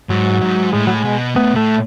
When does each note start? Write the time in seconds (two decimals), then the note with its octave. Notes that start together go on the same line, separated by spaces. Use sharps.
0.10 G#2 F#3
0.41 G#2
0.73 A2 G#3
0.87 F#3
0.94 G#3
1.05 B2
1.35 A2 B3
1.56 A2 A3